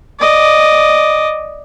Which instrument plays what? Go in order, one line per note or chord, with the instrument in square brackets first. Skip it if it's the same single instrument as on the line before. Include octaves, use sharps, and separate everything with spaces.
[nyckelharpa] D5 D#5